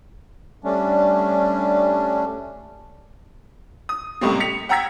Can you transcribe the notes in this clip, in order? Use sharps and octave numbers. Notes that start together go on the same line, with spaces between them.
G3 A3 C#4 D4
D#6
C#2 A2 C3 G3 A3 A#3
B6 C#7 F7
F#5 G5 A#5 E6 G#6 B6